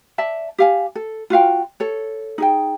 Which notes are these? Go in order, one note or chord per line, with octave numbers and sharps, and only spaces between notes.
D5 E5 A5
G4 F5 G#5
A4
F4 F#4 F5 G5
A4 C#5
D#4 G#4 G5